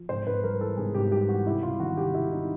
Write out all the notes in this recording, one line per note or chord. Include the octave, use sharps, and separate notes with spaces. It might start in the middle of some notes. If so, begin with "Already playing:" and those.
Already playing: F3
G#2 C5
G#2 B4
G3 A#4
E3 A4
G#2 G#4
G#2 G4
G3 G4
E3 F#4
C2 E4
C2 F4
D#3 F#4
C3 G4
C2 E4
D#4